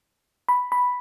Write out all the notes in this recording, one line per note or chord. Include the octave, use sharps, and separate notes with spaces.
B5
B5